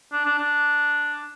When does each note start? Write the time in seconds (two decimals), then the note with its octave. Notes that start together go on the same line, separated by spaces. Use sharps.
0.13 D4
0.25 D4
0.38 D4